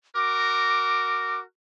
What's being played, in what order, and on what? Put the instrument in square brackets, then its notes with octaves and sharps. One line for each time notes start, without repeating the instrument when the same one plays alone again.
[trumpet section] F#4 A#4 [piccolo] D6